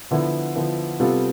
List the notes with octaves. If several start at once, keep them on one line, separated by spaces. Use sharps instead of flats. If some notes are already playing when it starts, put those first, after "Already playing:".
D3 F3 B3 E4
D3 F3 B3 E4
C3 G3 B3 F4 A4